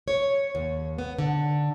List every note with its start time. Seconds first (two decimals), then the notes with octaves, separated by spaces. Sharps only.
0.08 C#5
0.55 D#2
0.98 B3
1.19 D3